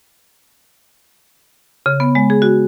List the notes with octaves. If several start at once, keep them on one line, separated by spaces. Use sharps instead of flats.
C#3
B3
G#3
G#4
F#4